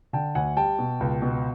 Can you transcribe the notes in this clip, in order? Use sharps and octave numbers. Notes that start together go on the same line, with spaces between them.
D3 G5 A5
D2 F#5 G#5
G3 G5 A5
B2
C#2
B2